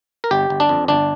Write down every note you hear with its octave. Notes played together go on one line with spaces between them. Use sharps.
A#4
G1 G4
G1
D4
F2
G1 D4